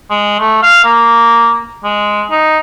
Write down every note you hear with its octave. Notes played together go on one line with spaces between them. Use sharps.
G#3
A3
F5
A#3
G#3
D#4